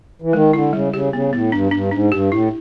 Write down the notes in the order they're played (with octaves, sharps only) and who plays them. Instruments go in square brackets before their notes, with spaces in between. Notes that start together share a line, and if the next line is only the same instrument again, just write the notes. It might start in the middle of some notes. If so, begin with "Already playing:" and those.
[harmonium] E3
[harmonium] D#3 [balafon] G#3
[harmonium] D3 [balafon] E4
[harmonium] C#3 [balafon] G3
[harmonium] C#3 [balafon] G4
[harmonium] C#3 [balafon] B3
[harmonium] A2 [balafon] B3
[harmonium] G2 [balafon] D4
[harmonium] G2 [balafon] D4
[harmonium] G#2 [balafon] D4
[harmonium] G2 [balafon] G4
[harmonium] A2 [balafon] E4